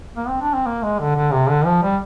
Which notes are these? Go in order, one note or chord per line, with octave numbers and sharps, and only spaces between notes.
A#3
C4
D4
C4
A#3
G#3
D3
D3
C3
D3
F3
G3